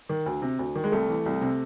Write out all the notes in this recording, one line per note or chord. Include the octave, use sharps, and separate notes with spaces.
D#3
D2
C3
D2
D#3
G#3
C2 A3
E3
C2
C3